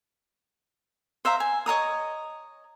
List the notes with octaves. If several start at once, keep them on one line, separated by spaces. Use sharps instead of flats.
C5 E5 F5 A#5
G#5
C#5 D#5 A#5 D#6